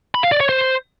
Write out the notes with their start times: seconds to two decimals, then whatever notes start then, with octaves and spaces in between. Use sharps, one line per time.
0.15 B5
0.23 F5
0.32 D5
0.40 C#5
0.49 C5